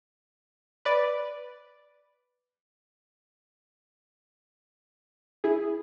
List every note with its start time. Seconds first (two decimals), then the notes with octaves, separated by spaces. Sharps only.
0.85 B4 D5
5.44 E4 G#4